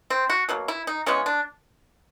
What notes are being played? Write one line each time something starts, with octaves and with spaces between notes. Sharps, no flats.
C4
F#4
B2 F#3 A#3
E4
D#4
C#3 E3 G#3 B3 C#4
D4